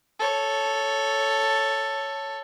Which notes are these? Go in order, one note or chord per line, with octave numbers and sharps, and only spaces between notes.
A4 C#5